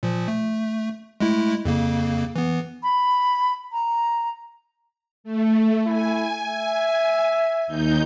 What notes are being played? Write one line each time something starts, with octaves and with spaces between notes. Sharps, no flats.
A#2 F3
A3
G#3 A3 E4
F2 C#3 A#3
E3 B3
B5
A#5
A3
E4 G#5
E5
D#2 D#4 G6